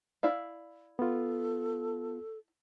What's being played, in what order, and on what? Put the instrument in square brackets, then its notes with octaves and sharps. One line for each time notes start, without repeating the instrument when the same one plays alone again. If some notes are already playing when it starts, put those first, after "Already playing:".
[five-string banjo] E4 D5 F5
[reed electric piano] B3 F4 [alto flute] A4